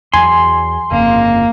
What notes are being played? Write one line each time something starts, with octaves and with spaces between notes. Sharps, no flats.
E2 F#3 G#5 C6
G1 F2 C#3 A#3